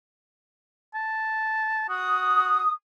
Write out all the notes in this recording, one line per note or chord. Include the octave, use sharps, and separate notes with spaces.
A5
F#4 D#6